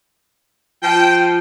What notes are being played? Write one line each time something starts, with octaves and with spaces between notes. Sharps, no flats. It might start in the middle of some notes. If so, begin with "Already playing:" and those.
F3 G5